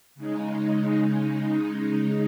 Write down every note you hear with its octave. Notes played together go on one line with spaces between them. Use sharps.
C#3 G#3 D#4